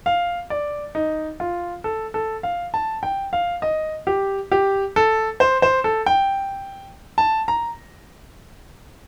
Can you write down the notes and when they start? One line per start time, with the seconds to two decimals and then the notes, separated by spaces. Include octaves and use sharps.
0.06 F5
0.50 D5
0.95 D#4
1.40 F4
1.84 A4
2.14 A4
2.43 F5
2.74 A5
3.03 G5
3.33 F5
3.62 D#5
4.07 G4
4.52 G4
4.96 A4
5.40 C5
5.62 C5
5.84 A4
6.06 G5
7.18 A5
7.48 A#5